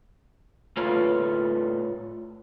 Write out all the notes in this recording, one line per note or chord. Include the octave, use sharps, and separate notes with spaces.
A2 F4 A4 B4 C#5